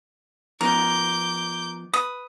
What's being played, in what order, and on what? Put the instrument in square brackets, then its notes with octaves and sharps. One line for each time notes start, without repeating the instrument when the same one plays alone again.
[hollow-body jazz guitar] F3 B3 D#4 [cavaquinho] A#4 [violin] D6 G6
[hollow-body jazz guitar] B4 [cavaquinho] D#6